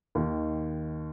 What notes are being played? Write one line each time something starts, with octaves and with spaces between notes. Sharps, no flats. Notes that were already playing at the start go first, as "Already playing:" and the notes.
D#2 D#3